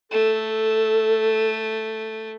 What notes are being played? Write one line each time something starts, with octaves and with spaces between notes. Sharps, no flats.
A3 A4